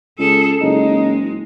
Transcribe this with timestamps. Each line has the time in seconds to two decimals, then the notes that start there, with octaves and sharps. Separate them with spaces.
0.18 C#2 G#4 A4
0.62 F#1 G#3 D#4